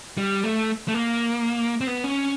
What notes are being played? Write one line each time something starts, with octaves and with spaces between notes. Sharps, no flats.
G3
A3
A3
A#3
C4
B3
C#4